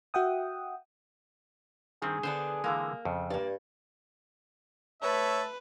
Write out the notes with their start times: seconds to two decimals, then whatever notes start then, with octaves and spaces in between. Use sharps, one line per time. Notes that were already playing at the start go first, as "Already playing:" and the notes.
0.14 F#4 E5 F#5 G5 D#6
2.02 G2 D#3 C4 G#4
2.23 D3 B3 D4 C5
2.64 D3 E3 G#3 A#3
3.05 F2 C#3
3.30 G2 A#3 D5
5.02 A3 B4 C#5 E5 A5